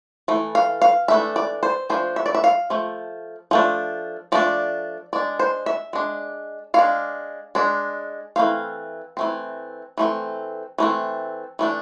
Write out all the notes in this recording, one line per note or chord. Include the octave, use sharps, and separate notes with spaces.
E3 A3
F5
F5
E3 A3 D4 E5
D5
C5
F3 A3 D4 C5
E5
D5
E5
F5
F3 A3
F3 A3 D4
F3 A3 D4 D5
G#3 D4 D5
C5
E5
G#3 D4
G#3 D4 F5
G#3 D4
E3 A3 C4 F5
E3 A3 C4
E3 A3 C4
E3 A3 C4
E3 A3 D4